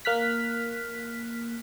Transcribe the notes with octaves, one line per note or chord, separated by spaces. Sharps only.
A#3 F6 F#6 B6